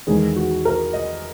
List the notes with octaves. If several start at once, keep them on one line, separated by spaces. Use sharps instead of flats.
E2 D#3 G#3 G#4
F#4
A#4
D#5